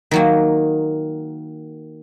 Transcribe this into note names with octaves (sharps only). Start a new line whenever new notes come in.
D#3 F#3 A#3